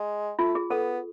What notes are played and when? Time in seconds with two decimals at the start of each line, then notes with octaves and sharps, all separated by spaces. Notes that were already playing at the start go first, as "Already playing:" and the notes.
Already playing: G#3
0.39 A3 F4
0.55 G#4
0.70 B3 A4